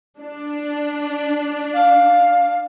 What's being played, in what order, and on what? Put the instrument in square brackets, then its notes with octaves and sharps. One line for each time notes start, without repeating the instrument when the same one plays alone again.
[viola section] D4
[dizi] F5